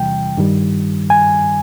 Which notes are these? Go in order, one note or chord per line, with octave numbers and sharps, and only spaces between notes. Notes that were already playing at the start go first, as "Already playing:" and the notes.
Already playing: E2 C3 E3 G3 G5
G2 D#3 G3
G#5